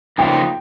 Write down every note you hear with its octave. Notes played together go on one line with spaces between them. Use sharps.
C#3 F3 A#3 D#4 G5